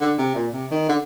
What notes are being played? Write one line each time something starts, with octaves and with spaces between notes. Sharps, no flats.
D3
C3
A#2
C3
D#3
D3